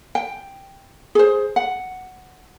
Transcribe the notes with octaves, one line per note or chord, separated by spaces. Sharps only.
G5
G#4 C5
F#5